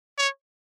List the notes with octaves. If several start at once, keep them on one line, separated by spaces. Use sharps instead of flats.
C#5